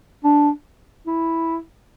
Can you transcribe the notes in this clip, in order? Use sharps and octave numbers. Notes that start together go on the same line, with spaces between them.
D4
E4